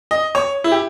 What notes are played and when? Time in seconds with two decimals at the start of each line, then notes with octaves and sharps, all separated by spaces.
0.11 D#5
0.35 C#5
0.64 E4
0.72 G4